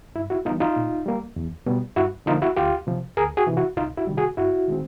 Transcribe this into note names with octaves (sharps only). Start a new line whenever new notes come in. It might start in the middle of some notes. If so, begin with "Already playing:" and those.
G2 E4
E4 F#4
E3 G3 B3 D#4 F4
D#4 F4
A#2
G3 A#3
E2
B2 G3 B3
G2 E4 F#4
D3 F3 A#3 D#4 F4
E4 F#4
D2 F4 G4
C3 F3
D2 G#4 A#4
F#4 G#4
C3 E3
E4 F#4
C2 D#4 F4
E4 F#4
C3 D#3 G3
F#4 G#4
G2 E4 F#4
D#3 G#3 C4